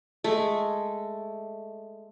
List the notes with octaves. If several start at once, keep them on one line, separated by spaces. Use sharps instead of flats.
G#3 A3